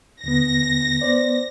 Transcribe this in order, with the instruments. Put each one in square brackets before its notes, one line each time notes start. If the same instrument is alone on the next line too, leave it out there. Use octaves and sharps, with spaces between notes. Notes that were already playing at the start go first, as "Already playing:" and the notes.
[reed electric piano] D#2 D3 B3 [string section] A#6
[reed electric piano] B3 C5 D5